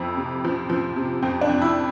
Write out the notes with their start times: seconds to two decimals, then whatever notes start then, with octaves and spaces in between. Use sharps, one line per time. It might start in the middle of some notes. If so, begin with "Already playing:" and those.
Already playing: F2 F3 E4
0.17 C3
0.44 F3
0.70 F3
0.96 C3
1.22 F2 C4
1.41 D4
1.49 F2
1.62 E4